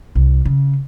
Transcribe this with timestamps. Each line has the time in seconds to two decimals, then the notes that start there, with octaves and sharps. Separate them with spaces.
0.15 C2
0.45 C#3